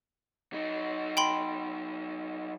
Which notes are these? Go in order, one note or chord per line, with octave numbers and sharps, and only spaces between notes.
F#3 D#4
G5 B5 C6